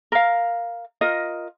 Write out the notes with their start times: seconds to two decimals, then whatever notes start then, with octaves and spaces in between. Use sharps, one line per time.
0.12 A#4 F5
1.01 F4 A#4 D#5